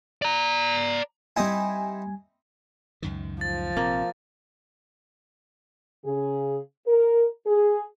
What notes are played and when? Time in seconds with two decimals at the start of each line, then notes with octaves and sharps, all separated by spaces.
0.22 D5 A#5
1.36 G3 C4 D#4 E4 G#5
3.02 C#2 F#2 D#3
3.41 F3 A6
3.77 A#1 C3 A#3 C4
6.04 C#3 G#4
6.86 A#4
7.45 G#4